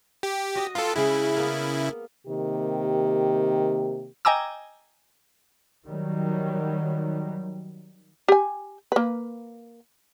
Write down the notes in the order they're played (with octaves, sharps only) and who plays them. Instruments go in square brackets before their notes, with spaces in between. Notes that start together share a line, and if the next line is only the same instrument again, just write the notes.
[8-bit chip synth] G4
[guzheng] F#4 D#5
[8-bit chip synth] F4 A4 [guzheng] B4 G5 B5
[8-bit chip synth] C#3 E4 [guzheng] G#3
[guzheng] A#3 B3
[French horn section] C3 D#3 A#3 G4
[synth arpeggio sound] D#5 G5 G#5 A#5 D6 E6
[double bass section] D#3 F#3 G3
[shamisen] G4 G#5
A#3 B4